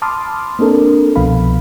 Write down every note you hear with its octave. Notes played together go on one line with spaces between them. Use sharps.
A5 B5 C6 D6 D#6 F6
A#3 C4 D4 A4 A#4
C2 B2 F3 B3 F5 B5